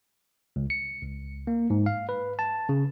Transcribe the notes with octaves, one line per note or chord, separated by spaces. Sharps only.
C#2
C#7
C#2
A#3
G#2
F5
B4
A5
C#3